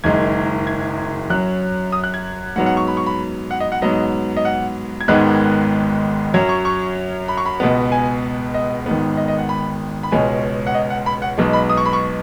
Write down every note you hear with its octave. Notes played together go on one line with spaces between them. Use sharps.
F#1 F#2 D#3 G#3 G#6
G#6
F#2 F#3 C#4 F#6
D#6
F#6
G#6
G#2 F#3 B3 F#5
F#5
C#6
B5
C#6
B5
F#5
D#5
F#5
G#2 F#3 B3 D#5
D#5
F#5
G#6
G#1 G#2 D#3 G#3 B3 F#6
F#2 F#3 C#4 G#6
C#6
C#6
B5
C#6
B5
C#2 B2 G#3 B3
G#5
D#5
G#1 G#2 D#3 B3
D#5
D#5
F#5
B5
B5
C#2 B2 G#3 C#4 G#5
F#5
D#5
F#5
B5
F#5
B1 B2 G#3
B5
D#6
C#6
B5
C#6